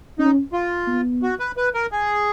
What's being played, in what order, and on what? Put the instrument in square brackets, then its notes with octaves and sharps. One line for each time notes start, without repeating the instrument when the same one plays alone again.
[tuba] C#4 [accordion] D#4
[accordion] F4
[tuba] B3
[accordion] F#4
B4
B4
A#4
G#4